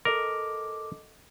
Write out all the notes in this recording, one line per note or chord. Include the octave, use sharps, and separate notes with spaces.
A4 A#4 D#5 D6